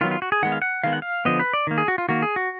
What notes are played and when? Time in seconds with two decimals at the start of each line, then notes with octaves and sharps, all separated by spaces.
0.01 D#3 F#3 B3 F4
0.11 F4
0.22 F#4
0.32 G#4
0.43 D#3 G#3 B3 F#5
0.52 F5
0.62 F#5
0.84 D#3 G#3 B3 F5
0.93 F#5
1.02 F5
1.25 D3 F3 B3 D#5
1.40 B4
1.53 D5
1.67 D#3 A#3
1.78 G#4
1.88 F#4
1.98 F4
2.09 D#3 A#3 F#4
2.22 G#4
2.36 F#4